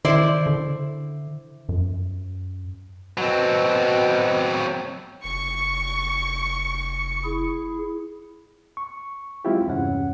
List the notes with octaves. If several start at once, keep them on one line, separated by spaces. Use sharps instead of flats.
D#3 E4 C5 D5
D3
F#2
B2 F#3 C4
F1 C#6 C#7
E4 G#4
C#6
F#3 G#3 C4 E4 F4 G4
E2 G2 C3 C#4 F#5